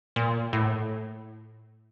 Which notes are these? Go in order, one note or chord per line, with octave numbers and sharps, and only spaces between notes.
A#2
A2